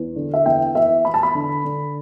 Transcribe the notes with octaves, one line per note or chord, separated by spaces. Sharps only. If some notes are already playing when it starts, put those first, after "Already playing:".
Already playing: E2
D3
E5
E2 G5
E2 E5
E2 B5
A5
B5
D3
D3